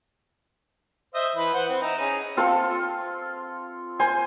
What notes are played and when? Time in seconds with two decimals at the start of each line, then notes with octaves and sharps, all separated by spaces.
1.15 C5 D#5 E5
1.36 E3 B4
1.54 B4 C5 F#5
1.69 C4
1.81 D#4 E4
1.98 C#4 D#4 G#4
2.37 C4 F4 A4
3.99 C5 G#5